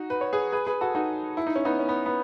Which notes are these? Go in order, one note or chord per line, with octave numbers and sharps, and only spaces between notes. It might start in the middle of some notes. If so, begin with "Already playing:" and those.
Already playing: D#4 F#4
B4
C#5
G#4 B4
G#4 B4
G#4 B4
F#4 A4
D#4 F#4
E4
D#4
C#4
B3 D#4
C#4
B3
B3